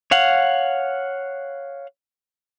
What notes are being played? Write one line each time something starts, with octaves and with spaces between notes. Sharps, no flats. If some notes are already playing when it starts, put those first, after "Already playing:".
C#5 F5 F#5